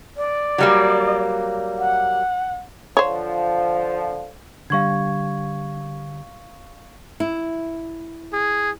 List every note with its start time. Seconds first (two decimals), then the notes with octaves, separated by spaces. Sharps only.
0.17 D5
0.58 F#3 G3 A#3
1.78 F#5
2.97 D3 F3 C5 C#5
4.70 D3 G3 F5 C#6 G#6
7.20 E4
8.33 G#4